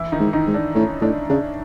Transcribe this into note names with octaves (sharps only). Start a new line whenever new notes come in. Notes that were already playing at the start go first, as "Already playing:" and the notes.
Already playing: E3 E4
D#3 D#4
G#2
D#3 D#4
G#2
D4
A2 C#4
A2 D4
C#3 D4